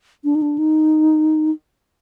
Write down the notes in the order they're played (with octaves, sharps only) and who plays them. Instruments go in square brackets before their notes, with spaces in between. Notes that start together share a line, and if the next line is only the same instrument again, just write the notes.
[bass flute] D4
D#4
D4
D#4